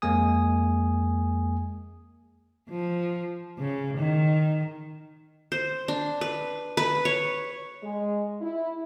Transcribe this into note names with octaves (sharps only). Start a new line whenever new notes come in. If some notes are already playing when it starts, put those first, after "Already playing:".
F2 G#3 A#3 G#5 D#6
F3
C#3
D#3
C5
D4
B4
B4
C#5
G#3
E4